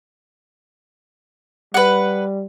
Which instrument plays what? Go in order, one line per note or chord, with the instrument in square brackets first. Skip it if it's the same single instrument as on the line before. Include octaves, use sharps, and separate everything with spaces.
[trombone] G3 [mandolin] B4 F#5